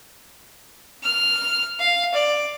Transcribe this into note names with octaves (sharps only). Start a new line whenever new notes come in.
F6
F5
D5